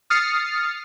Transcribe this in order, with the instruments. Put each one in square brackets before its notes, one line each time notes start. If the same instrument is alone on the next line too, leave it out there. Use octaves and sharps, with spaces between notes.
[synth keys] D#6 F6 A6 C7 C#7